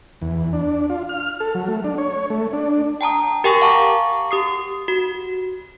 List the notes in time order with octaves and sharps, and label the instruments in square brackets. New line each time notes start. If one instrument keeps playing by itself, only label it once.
[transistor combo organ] E2
D4
F4
F6
A4
F#3
A3
D4
C#5
A3
D4
[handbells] G5 A5 A#5 D#6
G4 A#4 G5 G#5 C#6 A#6
F5 F#5 A5 A#5 C#6 D6
G4 D#6 C7
F#4